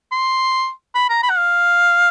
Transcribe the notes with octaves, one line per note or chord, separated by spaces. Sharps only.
C6
B5
A#5
B5
F#5
F5